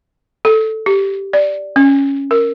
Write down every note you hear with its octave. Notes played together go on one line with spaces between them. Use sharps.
A4
G4
D5
C#4
A#4